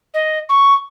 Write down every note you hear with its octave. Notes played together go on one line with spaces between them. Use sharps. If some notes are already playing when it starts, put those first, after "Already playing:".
D#5
C#6